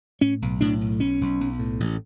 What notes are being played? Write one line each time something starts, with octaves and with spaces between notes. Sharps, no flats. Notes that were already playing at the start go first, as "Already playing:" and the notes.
A2 C#4
B1
A2 D4
B1
B1 C#4
B1
B1
A2
A1